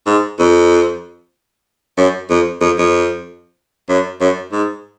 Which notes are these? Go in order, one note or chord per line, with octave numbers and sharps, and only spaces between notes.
G#2
F2
F#2
F2
F2
F2
F#2
F#2
G#2